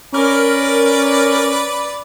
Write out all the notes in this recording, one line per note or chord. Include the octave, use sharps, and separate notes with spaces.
C#4 A#4 B4 D5 D6